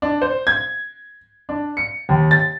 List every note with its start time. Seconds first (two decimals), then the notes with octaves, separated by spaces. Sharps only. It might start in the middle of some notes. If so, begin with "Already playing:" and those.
0.02 D4
0.22 C5
0.47 G#6
1.49 D4
1.77 C#7
2.09 D#2
2.31 A6